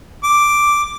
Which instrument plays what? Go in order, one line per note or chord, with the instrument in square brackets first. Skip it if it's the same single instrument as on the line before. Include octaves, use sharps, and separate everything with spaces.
[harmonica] D6